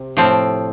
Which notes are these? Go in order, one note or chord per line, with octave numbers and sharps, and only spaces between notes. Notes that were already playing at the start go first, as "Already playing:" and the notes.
Already playing: C3
A2 F3 C4